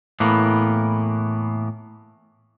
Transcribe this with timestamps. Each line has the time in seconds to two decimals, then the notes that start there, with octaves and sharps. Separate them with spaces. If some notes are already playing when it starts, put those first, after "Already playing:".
0.20 A2 E3 A#3 B3